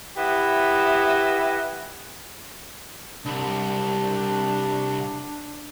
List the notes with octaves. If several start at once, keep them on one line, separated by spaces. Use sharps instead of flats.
E4 G4 B4 D#5 E5 F#5
C2 D4